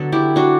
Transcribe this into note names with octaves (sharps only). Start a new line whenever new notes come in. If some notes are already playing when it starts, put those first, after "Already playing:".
Already playing: D3 F#3 B3 A4
E4 G4
D4 F#4